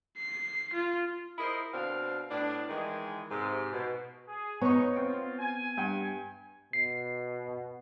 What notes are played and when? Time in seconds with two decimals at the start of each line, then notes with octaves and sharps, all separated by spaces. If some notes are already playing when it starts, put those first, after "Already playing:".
0.18 C7
0.73 F4
1.39 E4 G#4 A#4 C5 D#5
1.74 B2 C4 D4 F5
2.31 A2 B3 D4
2.69 D#3 E3 G#3
3.31 G#2 C3
3.73 B2
4.28 G#4
4.61 B3 D#4 C#5 C#6
4.96 C4 F4
5.39 G#5
5.77 G2 G5
6.73 B2 C7